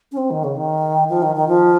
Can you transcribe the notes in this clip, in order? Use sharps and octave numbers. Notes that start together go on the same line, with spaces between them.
C#4
C4
D#3
C#3
D#3
F3
D#3
D#3
F3